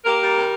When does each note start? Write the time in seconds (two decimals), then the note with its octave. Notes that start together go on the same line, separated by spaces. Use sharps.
0.05 A#3 G4 A#4
0.20 G3
0.36 C3